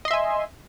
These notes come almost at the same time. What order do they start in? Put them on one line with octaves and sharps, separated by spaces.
D#5 C6 E5 G#5